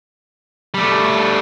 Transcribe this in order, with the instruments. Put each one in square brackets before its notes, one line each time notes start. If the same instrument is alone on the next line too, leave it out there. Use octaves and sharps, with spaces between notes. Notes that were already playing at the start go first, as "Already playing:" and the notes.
[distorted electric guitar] G3 A3